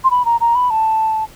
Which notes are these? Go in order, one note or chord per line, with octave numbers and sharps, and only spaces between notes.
C6
B5
A#5
A#5
B5
A5